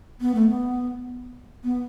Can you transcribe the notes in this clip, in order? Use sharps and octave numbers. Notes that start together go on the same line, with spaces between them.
B3
A3
B3
B3